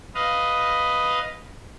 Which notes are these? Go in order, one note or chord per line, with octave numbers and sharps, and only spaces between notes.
B4 D#5 F5